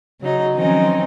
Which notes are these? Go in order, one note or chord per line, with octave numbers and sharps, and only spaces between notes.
C#3 F#3 D#4
D#3 F3 F#3 C4 C#4 D#4